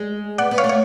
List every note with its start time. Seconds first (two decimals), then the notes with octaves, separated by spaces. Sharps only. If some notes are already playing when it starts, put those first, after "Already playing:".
Already playing: G#3
0.38 B3 D5 F#5
0.51 B3
0.58 C#5 F5
0.64 A3
0.69 C#5